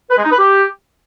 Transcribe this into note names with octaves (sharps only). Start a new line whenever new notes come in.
B4
G#3
D#4
B4
G4